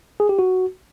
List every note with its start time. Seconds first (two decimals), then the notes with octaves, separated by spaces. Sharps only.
0.20 G#4
0.29 G4
0.39 F#4